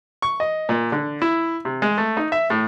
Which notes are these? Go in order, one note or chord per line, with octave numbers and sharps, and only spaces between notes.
C#6
D#5
A#2
D3
E4
C3
G#3
A3
D#4
E5
A2